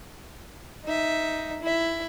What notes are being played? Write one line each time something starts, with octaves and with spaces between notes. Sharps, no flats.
D#4 E5
E4 E5